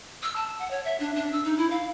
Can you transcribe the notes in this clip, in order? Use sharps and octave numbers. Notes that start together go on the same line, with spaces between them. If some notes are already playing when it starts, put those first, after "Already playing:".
E6
A5
F#5
C#5
E5
D4
D4
E6
D#4
E4
F5